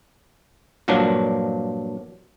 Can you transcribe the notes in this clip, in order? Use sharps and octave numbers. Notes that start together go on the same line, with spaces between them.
G2 A#2 F3 F#3 D4